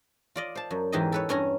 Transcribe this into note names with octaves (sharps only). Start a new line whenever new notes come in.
F4 D5 D#5
C5 A5
F#2
E2 G#2 E3 G4 G#4 D#5
A4 B4 C#5
G2 C#4 G#5 A#5